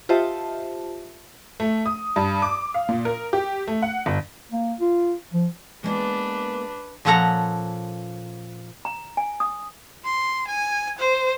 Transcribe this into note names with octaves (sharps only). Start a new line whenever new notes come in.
F4 G4 C5 D#5 E5 A5
A3
D#6
G2
D6
F5
A#2
A#4
G4
A3
F#5
G1
A#3
F4
F3
G#3 A#3 B3 D4 B4
A#2 F3 C#4 A4 F#5 A#5
A#5
G#5
D#6
C6
G#5
C5